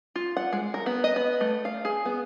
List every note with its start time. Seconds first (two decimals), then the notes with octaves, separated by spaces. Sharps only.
0.15 F4
0.37 F#5
0.52 G#3
0.74 A#4
0.86 B3
1.04 D#5
1.16 B3
1.41 A3
1.65 F5
1.85 G#4
2.05 B3